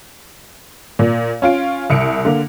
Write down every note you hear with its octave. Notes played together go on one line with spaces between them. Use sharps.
A#2
C#4 F4 D7
C2 C#7 D7
D3 A#3